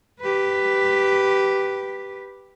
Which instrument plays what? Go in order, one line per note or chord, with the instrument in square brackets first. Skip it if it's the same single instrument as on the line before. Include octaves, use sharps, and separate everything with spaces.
[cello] G4 B4